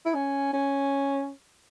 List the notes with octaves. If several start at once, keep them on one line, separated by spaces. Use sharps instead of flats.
E4
C#4
C#4